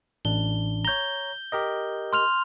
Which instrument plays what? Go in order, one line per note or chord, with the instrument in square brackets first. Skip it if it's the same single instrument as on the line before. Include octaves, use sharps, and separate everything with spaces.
[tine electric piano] A1 D4 [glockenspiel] G7
[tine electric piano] C#5 A#5 [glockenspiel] G6 G7
[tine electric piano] G4 A#4 D#5
[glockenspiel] C6 F6 F7